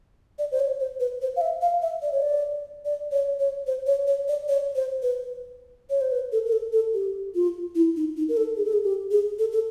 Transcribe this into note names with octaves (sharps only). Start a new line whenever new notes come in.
D5
C5
C#5
C5
B4
C5
F5
E5
F5
E5
D5
C#5
D5
D5
C#5
C#5
C5
C#5
C#5
D5
C#5
C5
B4
C#5
C5
B4
A4
A#4
A4
A4
G4
F4
E4
D#4
D#4
A#4
A4
G#4
A4
G#4
G4
G#4
A4
A4